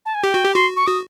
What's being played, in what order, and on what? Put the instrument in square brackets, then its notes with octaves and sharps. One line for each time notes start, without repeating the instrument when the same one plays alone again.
[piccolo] A5
G#5
[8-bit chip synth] G4 [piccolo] G5
[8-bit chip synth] F#4
G4
[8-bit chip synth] F#4 [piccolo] C6
[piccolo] C#6
[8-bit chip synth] F#4 [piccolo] D#6